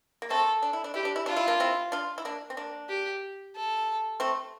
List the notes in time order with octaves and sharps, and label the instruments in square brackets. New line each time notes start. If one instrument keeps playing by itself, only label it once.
[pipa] A#3
[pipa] A3 C4 [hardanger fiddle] A4
[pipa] D4
E4
D4
[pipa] E4 [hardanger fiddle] G4
[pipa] D4
E4
[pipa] D4 [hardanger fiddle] F4
[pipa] E4
A#3 D4
C4 E4
D4 F4
E4
A#3 D4
C4
A#3 D4
[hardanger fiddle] G4
A4
[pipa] A3 C4